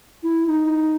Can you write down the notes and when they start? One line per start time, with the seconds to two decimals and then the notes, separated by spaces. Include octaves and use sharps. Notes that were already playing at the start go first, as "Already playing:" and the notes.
0.23 E4
0.47 D#4